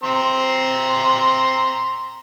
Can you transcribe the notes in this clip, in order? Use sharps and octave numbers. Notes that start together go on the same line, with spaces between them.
C4 A#5 C6